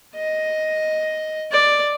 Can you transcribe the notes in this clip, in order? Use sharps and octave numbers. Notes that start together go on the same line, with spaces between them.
D#5
D5